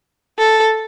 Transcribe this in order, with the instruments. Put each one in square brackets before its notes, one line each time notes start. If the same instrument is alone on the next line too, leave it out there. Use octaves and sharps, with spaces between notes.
[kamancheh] A4